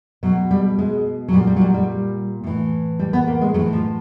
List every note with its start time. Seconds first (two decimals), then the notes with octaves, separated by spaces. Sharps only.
0.23 B2 F#3
0.51 G3
0.79 G#3
1.28 F#3
1.33 A#2 G3
1.47 G3
1.56 F#3
1.61 G3
1.74 G3
2.44 A2 E3
2.99 G3
3.13 B3
3.28 A#3
3.41 G#3
3.54 A2 E3 F#3
3.73 F3